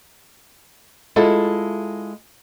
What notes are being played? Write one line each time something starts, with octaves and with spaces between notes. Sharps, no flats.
G#3 E4 F4 A4